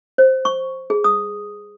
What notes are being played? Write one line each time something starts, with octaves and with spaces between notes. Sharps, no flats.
C5
C#6
G#4
D#6